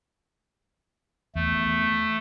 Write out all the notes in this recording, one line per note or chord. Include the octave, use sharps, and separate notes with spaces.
E2 A3